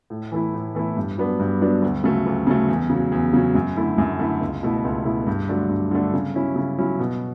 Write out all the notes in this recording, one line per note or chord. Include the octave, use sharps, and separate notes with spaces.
A2
E3 A3 E4
A2
E3 A3 E4
G2
F#3 B3 D4
G2
F#3 B3 D4
D2
C#3 F#3 A3
D2
C#3 F#3 A3
E2
C#3
F#3
E2
C#3 F#3
F#2
D3 A3 E4
F#2
D3 A3 E4
C#2
B2 A3 E4
C#2
B2 A3 E4
G2
D3 F#3 A3 D4
G2
D3 F#3 A3 D4
C#3
F#3 C#4 E4
C#3
F#3 C#4 E4
B2